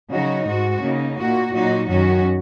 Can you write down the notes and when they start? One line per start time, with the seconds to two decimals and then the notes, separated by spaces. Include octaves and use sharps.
0.11 C#3 F#3 D#4 F#4
0.46 G#2 G#3 F#4
0.81 C#3 A#3 D#4
1.17 A#2 A#3 F#4
1.52 A#2 F#3 D#4 F#4
1.88 F#2 D#3 F#3 C#4 F#4